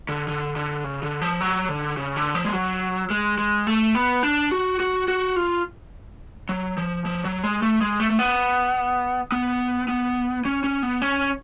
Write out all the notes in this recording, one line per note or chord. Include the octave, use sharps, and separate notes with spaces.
D3
D3
D3
C#3
D3
F3
F#3
D3
C#3
D3
F3
G#3
F#3
G#3
G#3
A3
B3
D4
F#4
F#4
F#4
F4
F#3
F3
F3
F#3
G#3
A3
G#3
A3
A3
B3
B3
B3
C#4
C#4
B3
C#4